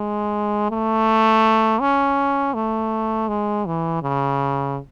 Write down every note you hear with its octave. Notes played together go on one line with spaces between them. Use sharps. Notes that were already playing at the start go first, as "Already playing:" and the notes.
Already playing: G#3
A3
C#4
A3
G#3
E3
C#3